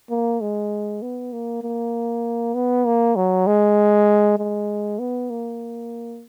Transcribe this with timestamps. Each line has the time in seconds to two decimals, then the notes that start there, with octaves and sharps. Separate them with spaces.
0.10 A#3
0.41 G#3
1.02 B3
1.32 A#3
1.63 A#3
2.54 B3
2.86 A#3
3.16 F#3
3.47 G#3
4.38 G#3
4.99 B3
5.30 A#3